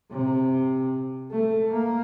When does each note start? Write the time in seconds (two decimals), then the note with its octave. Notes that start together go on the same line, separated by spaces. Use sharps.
0.11 C3
1.31 A3
1.72 A#3